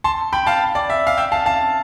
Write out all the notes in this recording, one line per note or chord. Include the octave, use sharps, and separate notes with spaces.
A5 C6
G5 B5
F5 A5
D5
E5
F5
E5 G5
F5 A5
F5 A5